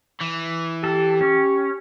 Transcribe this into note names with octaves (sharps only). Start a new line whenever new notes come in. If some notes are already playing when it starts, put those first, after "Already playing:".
E3
G4 A4
C#4